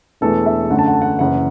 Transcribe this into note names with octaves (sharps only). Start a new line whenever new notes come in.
E1 E2 E3 A3 A4
E5
F#2 D3 A3 F#5
A5
F#5
A5
F#5
F#1 F#2 E3 F#5